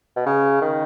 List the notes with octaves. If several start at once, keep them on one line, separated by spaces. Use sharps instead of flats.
B2
C#3
D#3